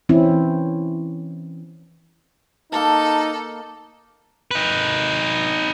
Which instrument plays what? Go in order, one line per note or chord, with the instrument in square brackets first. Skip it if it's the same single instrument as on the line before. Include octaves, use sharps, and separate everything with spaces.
[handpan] E3 C4 C#4 E4
[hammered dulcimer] A#3 A5 [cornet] D#4 [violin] A4
[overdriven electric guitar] D#4 B4